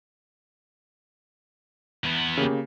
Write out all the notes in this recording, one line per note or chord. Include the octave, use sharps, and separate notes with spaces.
E2 B3
C#3 A#3 G4